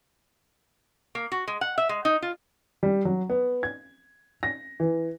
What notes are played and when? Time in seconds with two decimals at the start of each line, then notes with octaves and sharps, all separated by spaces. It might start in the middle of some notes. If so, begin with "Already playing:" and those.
1.15 A#3
1.32 F#4
1.48 G#3
1.61 F#5
1.78 E5
1.89 G#3
2.05 D#4
2.22 F4
2.83 G3
3.05 F#3
3.30 B3
3.63 G#6
4.43 A#6
4.80 E3